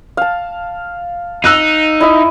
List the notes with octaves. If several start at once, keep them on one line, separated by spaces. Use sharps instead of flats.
F5 A5
D#4 E6 F#6 D#7
E4 D#5 E5